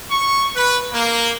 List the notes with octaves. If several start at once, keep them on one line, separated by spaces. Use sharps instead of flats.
C#6
B4
A#3